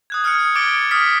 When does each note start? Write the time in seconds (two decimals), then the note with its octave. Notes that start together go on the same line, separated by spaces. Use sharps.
0.10 D#6 F#6 G#6
0.24 D#6 F6 F#6 G#6 C#7
0.55 D6 G#6 A6 C#7 D7 G7
0.91 D#6 F6 A6 B6